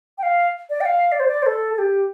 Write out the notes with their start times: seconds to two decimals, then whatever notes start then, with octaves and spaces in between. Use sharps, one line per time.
0.18 G5
0.23 F5
0.70 D5
0.81 G5
0.85 F5
1.12 D5
1.20 C5
1.28 D5
1.42 C5
1.46 A4
1.73 A4
1.78 G4